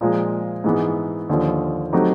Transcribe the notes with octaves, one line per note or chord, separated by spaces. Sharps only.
A#2 F3 G#3
G#2 E3 G#3 B3
D#2 D3 F3
F#3 A3 C4 D#4 G4